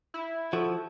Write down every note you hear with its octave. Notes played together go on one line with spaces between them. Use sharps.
E4
F3 F#4 A4